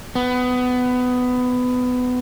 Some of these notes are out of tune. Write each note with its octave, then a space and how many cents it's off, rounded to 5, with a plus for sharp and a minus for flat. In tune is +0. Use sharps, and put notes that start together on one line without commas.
B3 +20